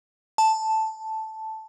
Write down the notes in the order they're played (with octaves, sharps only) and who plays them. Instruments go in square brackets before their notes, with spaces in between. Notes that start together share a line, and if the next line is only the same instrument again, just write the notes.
[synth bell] A5